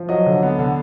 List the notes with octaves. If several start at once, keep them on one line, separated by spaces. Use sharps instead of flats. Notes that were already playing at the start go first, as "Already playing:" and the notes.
Already playing: F3
F#3 D#5
D3
B3
D3